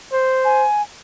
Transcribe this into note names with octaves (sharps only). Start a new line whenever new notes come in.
C5
G#5